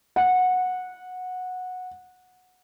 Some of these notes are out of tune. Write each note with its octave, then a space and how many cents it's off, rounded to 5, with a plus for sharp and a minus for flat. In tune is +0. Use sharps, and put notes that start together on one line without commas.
F#5 -15